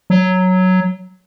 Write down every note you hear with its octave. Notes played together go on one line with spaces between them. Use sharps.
F#3